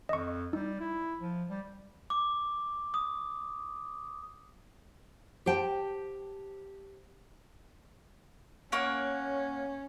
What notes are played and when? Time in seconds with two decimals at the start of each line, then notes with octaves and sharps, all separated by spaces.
0.09 F2 D#5 C#6
0.53 G3 D#4
0.80 E4
1.21 F3
1.49 G3
2.10 D6
2.94 D#6
5.46 G4 C5 G5 A5
8.72 A#3 C#4 C#5 F#5